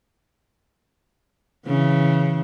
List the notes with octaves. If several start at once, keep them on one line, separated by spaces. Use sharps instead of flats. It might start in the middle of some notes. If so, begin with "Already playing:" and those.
C#3 E3